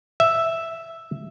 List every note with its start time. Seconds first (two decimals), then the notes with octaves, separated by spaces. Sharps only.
0.20 E5